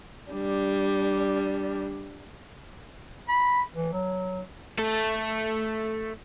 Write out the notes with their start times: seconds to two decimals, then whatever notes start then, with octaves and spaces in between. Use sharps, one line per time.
0.32 G3 D4
3.29 B5
3.75 E3
3.93 F#3
4.78 A3 A4